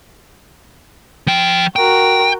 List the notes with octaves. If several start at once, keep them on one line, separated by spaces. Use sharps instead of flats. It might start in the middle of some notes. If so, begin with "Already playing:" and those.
F3 G5
F#4 A#4 G5